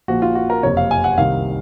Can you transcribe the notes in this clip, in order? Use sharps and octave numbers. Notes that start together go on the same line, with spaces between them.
A#1 A#2 F3 F#4
F4
F#4
A#4
F#1 F2 C3 C#5
F5
G#5
F#5
C2 C3 D#3 F5